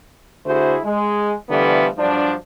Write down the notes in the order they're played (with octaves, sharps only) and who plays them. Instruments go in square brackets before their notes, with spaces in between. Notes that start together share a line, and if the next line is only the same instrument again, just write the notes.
[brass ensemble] D3 A3 E4 F#4 G#4 C5
G#3
D3 E3 F3 G3 A3 B3
G2 F3 F#3 D4